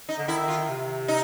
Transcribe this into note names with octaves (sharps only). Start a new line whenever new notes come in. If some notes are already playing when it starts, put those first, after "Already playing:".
D#4
D3
D#3 E4
F4
C3
D#4